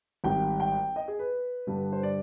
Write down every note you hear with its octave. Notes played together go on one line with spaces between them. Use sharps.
G#1 G#2 G3 G5
G5
D#5
G#4
B4
G2 D3 G3 D4
C5
D5